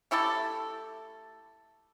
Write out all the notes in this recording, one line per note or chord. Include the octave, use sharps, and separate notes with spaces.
A3 E4 G4 A4